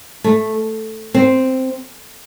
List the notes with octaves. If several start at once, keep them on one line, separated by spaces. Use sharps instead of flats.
A3
C4